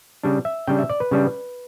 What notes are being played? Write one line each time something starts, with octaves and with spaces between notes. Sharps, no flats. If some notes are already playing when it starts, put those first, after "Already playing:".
C#3 G3 D4
E5
C#3 G3 D4 G5
E5
D5
B4
C#3 G3 D4